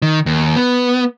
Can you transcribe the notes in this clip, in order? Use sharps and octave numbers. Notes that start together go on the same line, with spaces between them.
D#3
D#2
B3